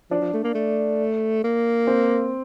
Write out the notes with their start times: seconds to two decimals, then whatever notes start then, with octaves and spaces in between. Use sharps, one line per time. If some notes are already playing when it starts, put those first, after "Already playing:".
0.11 F3 D4
0.21 F3
0.33 A3
0.44 A#3
0.55 A3
1.44 A#3
1.87 C4